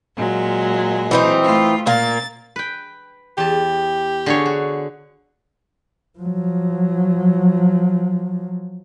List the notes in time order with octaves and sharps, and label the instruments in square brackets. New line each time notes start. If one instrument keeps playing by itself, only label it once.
[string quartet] A#2 F#3 G#3
[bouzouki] E3 C4 D#4
[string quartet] A3 F4
[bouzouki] A#2 A#3 [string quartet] A6
[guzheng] B4 G5
[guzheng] E2 A5 [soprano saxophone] G4
[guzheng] D3 G#4 C#5
F#4
[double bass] F3 F#3